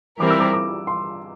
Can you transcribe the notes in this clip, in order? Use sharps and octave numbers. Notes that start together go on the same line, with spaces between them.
E3 G3 C4 E4 A#4 D6
E6
D6
D6
C6